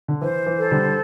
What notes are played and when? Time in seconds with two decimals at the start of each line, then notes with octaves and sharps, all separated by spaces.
0.08 D3
0.22 E3 C5
0.46 E3
0.59 A4
0.71 D3 G3